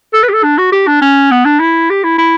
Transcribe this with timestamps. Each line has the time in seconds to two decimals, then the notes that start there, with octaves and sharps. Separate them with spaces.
0.14 A4
0.23 B4
0.29 G4
0.33 A4
0.43 D4
0.58 F#4
0.72 G4
0.87 D4
1.01 C#4
1.31 B3
1.45 D4
1.60 E4
1.90 G4
2.04 E4
2.18 E4